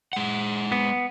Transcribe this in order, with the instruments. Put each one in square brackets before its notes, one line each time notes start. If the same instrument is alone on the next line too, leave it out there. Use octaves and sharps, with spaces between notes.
[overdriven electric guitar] G#3 F#5
[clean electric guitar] B3